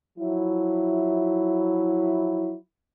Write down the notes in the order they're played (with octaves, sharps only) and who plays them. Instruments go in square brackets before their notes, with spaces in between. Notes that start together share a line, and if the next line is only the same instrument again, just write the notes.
[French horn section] F3 F#3 E4